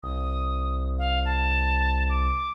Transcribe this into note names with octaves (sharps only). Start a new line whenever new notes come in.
C2 D#6
F5
A5
D6